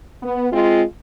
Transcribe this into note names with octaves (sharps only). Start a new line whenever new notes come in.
B3
G#3 C4 F4